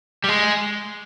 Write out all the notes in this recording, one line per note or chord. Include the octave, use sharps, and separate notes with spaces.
G3
G#3